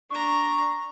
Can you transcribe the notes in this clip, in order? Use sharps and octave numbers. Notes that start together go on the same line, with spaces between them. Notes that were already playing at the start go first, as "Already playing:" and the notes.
D4 A#5 C#6